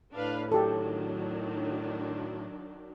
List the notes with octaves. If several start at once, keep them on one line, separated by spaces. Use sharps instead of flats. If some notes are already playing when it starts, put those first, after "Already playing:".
A2 D4 B4 F5
D#3 F#3 D4 G4 A4